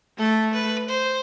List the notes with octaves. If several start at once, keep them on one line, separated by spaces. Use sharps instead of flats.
A3 A4
B4
C5